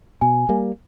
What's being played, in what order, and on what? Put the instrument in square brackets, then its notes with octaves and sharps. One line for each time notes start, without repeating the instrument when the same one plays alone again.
[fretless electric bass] B2 [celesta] G#5
[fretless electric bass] G3 A#3